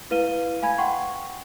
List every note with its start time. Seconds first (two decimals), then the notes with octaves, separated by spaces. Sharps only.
0.11 E4 B4 F5 D#7 G7
0.62 F5 G#5 B5 G#6
0.78 F#5 G5 C6 C#6